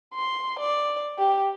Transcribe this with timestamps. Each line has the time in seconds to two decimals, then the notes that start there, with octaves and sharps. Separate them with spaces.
0.15 C6
0.59 D5
1.19 G4